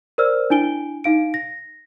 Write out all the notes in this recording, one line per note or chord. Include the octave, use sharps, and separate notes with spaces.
A#4 C5 D5 E6 F6
D4 E4 G#5 D7 G7
D#4 F5 D7
A#6